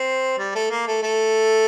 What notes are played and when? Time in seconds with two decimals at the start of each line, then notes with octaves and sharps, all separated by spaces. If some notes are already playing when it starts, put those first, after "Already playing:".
Already playing: C4
0.38 G3
0.55 A3
0.71 A#3
0.87 A3
1.03 A3